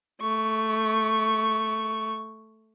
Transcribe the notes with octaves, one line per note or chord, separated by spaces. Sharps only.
A3 C#6